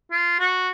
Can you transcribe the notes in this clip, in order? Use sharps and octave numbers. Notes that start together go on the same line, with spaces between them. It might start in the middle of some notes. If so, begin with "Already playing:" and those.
F4
F#4